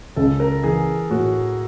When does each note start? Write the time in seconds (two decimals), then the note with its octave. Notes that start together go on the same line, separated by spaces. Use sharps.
0.16 C#2 A4
0.40 A#4
0.64 E3 G#4
1.10 A2 F#4